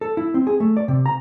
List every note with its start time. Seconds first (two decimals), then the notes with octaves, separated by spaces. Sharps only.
0.01 A4
0.17 E4
0.34 C4
0.47 G#4
0.60 A3
0.77 D5
0.88 C3
1.06 A#5